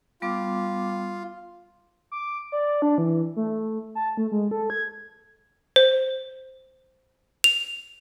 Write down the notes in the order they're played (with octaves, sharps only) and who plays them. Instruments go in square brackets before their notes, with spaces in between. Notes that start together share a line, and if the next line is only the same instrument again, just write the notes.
[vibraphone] G3 B3 D6 [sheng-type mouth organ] F4
[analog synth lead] D6
D5
D4
E3
A3
A5
A3
G#3
A4
G#6
[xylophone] C5
F7